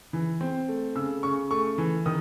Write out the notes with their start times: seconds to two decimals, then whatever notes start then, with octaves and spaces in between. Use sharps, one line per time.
0.13 E3
0.41 C4
0.68 A3
0.96 C#3 E6
1.23 C#3 C#6
1.51 A3 C#6
1.78 E3
2.06 D#3 D#6